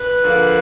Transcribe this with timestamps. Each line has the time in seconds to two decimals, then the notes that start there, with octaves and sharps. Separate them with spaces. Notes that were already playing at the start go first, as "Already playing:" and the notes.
Already playing: B4
0.22 D3 F3 A#3